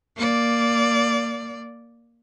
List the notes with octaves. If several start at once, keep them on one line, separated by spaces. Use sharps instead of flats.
A#3 D5